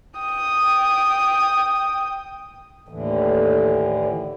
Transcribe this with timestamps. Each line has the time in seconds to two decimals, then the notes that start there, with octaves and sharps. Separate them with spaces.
0.19 G5 D#6
2.88 D#2 A2 D3 E3